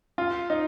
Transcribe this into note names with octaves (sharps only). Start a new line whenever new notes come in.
F4
D#4